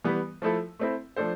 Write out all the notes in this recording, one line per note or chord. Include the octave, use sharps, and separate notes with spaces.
E3 G3 B3
F3 A3 E4 A4
A3 C4 E4
F3 A3 D4 A4 C5